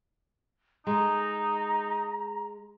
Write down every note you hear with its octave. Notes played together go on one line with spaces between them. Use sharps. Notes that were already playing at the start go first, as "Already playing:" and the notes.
G#3 D#4 A#5